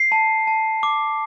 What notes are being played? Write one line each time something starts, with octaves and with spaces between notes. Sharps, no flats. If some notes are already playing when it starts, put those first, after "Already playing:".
Already playing: C7
A5
A5
D6